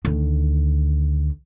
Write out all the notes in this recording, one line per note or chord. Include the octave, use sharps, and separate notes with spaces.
D2 D#3